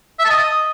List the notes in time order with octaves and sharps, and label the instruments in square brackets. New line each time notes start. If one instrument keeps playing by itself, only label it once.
[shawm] E5
A5
D#5